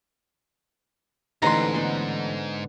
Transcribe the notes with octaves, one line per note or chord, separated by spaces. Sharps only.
A1 G#2 D3 D#4 B4 A#5 C6 D6
D3 B3 C5